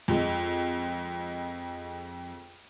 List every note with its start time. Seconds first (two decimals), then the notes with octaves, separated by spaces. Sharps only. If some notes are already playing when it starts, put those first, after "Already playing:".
0.08 F2 G#3